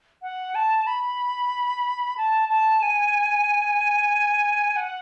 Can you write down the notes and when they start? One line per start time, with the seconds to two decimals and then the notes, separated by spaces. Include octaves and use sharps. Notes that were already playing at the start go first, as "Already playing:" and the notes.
0.22 F#5
0.55 A5
0.87 B5
2.17 A5
2.49 A5
2.82 G#5
4.76 F#5